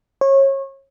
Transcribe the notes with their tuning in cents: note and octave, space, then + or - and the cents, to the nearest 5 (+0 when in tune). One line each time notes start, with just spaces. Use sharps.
C#5 -30